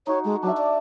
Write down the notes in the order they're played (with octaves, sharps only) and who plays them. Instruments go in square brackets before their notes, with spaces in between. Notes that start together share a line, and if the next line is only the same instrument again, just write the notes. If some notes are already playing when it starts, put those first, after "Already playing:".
[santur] D#4 F#4 [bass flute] C#5
[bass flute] G#3 [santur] A4
[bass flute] F#3 [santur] D4 E5
[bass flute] D5